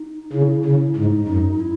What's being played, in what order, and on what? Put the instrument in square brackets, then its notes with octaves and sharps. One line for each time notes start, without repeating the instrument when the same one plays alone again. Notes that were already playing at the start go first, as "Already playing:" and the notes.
Already playing: [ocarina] D#4
[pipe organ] C#3 [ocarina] E4
[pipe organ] C#3 [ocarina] E4
[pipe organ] G#2 [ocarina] D#4
[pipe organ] F#2
[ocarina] E4